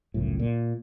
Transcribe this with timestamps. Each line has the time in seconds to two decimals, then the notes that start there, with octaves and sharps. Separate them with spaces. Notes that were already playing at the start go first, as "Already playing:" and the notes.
0.14 G1 C#2 F#2 A2
0.39 A#2